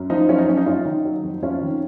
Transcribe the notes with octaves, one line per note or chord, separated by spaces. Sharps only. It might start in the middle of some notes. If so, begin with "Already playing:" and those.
Already playing: F#2
F3 D#4
F#3 C#4 F4
D#4
F#2 C#4
D#4
F#2 C#4 F4
D#3 D#4
F#3
F2
F2 C#4 F4
D#3